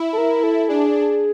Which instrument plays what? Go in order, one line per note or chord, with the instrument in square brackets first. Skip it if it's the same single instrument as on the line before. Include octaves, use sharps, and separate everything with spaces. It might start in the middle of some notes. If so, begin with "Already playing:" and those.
Already playing: [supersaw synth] E4
[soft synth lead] A4
A#4
A4
[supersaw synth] D4 [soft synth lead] G#4